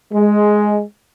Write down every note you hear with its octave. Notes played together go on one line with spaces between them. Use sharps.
G#3